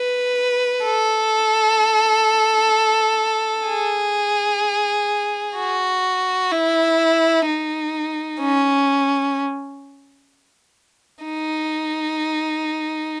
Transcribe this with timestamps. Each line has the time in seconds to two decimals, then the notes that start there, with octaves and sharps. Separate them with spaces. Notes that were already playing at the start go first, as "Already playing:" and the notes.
Already playing: B4
0.83 A4
3.67 G#4
5.57 F#4
6.51 E4
7.46 D#4
8.41 C#4
11.25 D#4